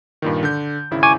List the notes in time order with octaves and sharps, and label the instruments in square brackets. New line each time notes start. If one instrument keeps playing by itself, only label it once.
[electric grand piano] G2 A#2 D#3
D3 G6
G#1 C#3 E4
[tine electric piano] G#5 C#6 D6